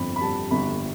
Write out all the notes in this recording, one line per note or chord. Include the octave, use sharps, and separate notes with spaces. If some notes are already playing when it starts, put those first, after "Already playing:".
Already playing: G1 F2 B5
B5
G3 A5
G1 B5